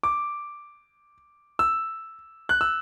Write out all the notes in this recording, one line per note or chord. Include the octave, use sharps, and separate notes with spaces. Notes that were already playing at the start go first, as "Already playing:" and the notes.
D6
E6
F#6
E6